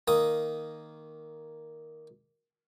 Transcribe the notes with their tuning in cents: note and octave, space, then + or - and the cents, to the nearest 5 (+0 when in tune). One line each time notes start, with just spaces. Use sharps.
D#3 +0 A#3 +0 D#6 +0